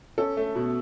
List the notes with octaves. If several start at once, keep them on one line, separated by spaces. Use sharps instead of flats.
C#4 A4
A3
B2